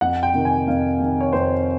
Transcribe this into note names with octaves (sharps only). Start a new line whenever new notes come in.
F2 F#5
G5
C3 D#3
G#5
F2 F5
C3 D#3
C#5
F2 C5